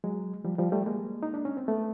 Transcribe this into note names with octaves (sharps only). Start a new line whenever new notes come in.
F#3 G#3
F3 G3
F3 G3
G3 A3
G#3 A#3
D#4
D4
C#4
C4
A3 B3